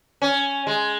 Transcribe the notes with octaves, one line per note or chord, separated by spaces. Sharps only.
C#4
G#3